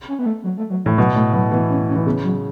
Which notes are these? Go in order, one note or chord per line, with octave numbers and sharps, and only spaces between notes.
C#4
B3
A3
F#3
A3
F#3
A2 E3
B2 F#3
A2 A3
B2 F#3
E3 B3
C#4
C#4
E3
C#3 B3
F#3